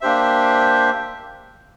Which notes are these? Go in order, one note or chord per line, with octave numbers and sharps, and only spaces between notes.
A#3 D4 G4 C5 E5